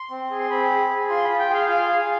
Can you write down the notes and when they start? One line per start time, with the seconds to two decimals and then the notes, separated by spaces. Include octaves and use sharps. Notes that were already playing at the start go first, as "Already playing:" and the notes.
Already playing: C6
0.11 C4
0.31 G#4
0.40 C6
0.50 C4 B5
0.70 G#4
0.90 G#4
1.10 F4 C6
1.24 B5
1.29 F4
1.39 G5
1.49 G#4 F5
1.69 F4 F5
1.89 G#4